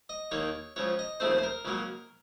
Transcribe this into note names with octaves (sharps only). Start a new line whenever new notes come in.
D#5
D#2 D#3 A#3 C#5
C#2 C#3 F3 C#5
D#5
D#2 C#3 F3 A3 C4 C5
C5
A#4
C#2 C#3 F#3 A#3